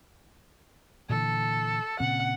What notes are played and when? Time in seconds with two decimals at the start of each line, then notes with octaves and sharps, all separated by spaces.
1.09 A#2 D3 E3 A4
2.00 A#2 C#3 C4 F#5